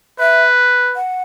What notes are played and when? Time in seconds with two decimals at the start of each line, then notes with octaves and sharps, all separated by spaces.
0.19 B4 E5
0.96 F#5